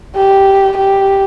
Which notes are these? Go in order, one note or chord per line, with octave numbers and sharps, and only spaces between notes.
G4
G4